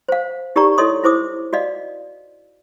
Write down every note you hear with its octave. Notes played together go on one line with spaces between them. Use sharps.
C5 F5
D#4 G4 A#4 D5 A#5 C#6
E4 A4 C#5 D#5 C6 D#6
E4 C5 D6 D#6
F#4 D5 D#5 F5